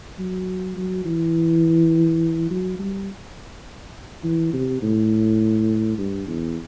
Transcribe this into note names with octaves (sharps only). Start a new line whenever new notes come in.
F#3
F#3
E3
F#3
G3
E3
C3
A2
G2
E2